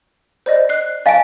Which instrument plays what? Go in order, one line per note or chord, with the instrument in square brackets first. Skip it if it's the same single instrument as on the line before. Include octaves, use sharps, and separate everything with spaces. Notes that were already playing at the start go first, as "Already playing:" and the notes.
[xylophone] C5 D5 D#5
F#6 C7
[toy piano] D#5 F5 [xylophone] G#5 A5 D7